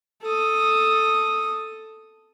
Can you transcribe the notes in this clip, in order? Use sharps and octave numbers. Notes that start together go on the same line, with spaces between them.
A4 D#6